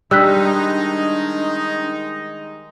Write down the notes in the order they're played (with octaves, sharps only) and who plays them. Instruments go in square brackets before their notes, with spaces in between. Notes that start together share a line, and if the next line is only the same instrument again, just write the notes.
[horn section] D#3 G#3 D#4 [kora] G3 [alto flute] D4 [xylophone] E6 F#6 B6